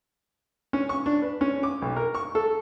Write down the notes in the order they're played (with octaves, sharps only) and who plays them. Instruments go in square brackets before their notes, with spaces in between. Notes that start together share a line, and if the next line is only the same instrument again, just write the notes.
[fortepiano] C#4
C#6
D4
B4
C#4
D6
B1
A#4
C#6
A4